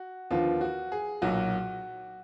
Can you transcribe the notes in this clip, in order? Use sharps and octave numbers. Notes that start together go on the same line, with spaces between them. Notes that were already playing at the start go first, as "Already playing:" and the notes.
Already playing: F#4
D#2 D3 F3 B3 F4
F#4
G#4
B1 A#2 F#3 F#4